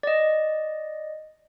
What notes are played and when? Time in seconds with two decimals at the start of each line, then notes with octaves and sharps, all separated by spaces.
0.03 D5 D#5